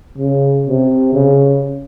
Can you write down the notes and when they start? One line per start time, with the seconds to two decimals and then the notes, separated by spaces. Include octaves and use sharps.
0.18 C#3
0.67 C3
1.14 C#3